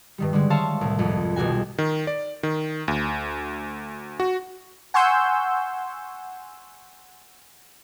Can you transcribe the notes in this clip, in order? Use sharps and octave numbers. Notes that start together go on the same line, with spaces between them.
G2 D#3 G3
D3 G3 G#3
C5 C#5 E5 F5 A5
C2 A2
G#1 F2
D#1 B1 G3 F#4 G#5
D#3
D5
D#3
D2
F#4
F#5 G#5 C6 C#6 E6 G6